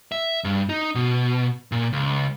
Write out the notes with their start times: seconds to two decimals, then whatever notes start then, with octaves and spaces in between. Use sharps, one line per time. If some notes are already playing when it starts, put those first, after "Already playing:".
0.12 E5
0.44 G2
0.69 D#4
0.95 B2
1.72 A#2
1.93 C#2